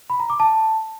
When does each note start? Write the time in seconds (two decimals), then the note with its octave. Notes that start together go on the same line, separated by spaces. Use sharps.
0.10 B5
0.20 A#5
0.30 D6
0.40 A5